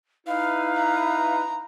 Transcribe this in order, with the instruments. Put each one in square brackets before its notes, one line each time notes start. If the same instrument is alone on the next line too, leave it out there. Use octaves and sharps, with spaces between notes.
[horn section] D#4 E4 B4 [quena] F5
[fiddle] A#5